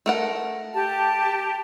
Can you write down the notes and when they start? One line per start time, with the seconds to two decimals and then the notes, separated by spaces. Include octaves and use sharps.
0.06 A3 A#4 F#5
0.74 G4 A5